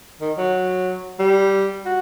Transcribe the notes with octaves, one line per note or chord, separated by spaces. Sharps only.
D#3
F#3
G3
F#4